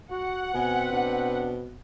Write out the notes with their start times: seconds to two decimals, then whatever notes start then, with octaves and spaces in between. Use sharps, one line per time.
0.11 F#4 F#5
0.55 B2 C4 B4 G#5
0.92 B2 D4